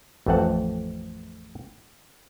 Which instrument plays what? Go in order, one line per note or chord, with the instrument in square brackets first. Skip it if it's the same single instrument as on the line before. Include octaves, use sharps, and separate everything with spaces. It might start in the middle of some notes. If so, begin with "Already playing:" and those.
[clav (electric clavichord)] A1 F2 A3 C4 F#5 A5